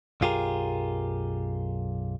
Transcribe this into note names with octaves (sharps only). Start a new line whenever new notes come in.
B1 F#2 F4 G4 G#4 A#4